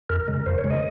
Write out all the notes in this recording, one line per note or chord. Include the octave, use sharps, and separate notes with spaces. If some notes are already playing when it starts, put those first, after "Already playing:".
F2 A#4
C#3 G#3
F2 C5
C#5
C#3 G#3
D#5